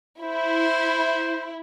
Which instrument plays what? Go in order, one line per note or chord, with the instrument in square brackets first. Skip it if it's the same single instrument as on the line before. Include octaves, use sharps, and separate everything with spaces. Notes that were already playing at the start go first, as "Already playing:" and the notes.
[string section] E4 [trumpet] C5